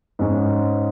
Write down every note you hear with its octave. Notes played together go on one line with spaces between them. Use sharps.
G#2 G#3 C#4